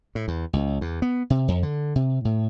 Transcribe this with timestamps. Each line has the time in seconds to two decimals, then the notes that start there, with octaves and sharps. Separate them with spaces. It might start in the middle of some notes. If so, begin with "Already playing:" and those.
0.15 A2
0.28 E2
0.53 C#2
0.81 E2
1.02 B3
1.30 C3
1.48 F2
1.63 D3
1.96 C3
2.25 A2